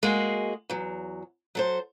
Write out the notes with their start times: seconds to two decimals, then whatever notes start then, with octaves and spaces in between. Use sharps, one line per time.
0.03 G#3 A#3 F#4 G#4
0.70 E2 F#3
1.55 F#3 A4 C5